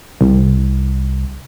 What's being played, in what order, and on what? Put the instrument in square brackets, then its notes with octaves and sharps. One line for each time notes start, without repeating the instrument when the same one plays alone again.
[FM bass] C2